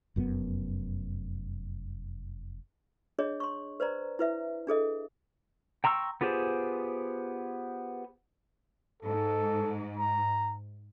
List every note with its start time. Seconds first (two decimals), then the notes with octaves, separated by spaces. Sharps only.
0.16 F1 F#2 C3 B3
3.19 D4 G#4 C#5 D#5
3.40 C6 C#6
3.80 B4 C5 D5 A#5
4.19 E4 B4 E5
4.67 D4 G#4 A4 D#5
5.84 G5 A#5 C6 C#6 E6
6.21 B3 F4 G4 G#4 C5
9.03 G#2 A4
9.98 A#5